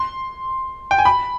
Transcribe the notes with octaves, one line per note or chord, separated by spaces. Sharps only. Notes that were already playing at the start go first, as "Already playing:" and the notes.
Already playing: C6
G5
G#5
B5